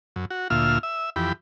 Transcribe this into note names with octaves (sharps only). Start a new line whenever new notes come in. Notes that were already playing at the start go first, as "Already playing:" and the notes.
F#2
F#4
D2 A#2 F4 E5 F6
E5
F2 E3 G4 B5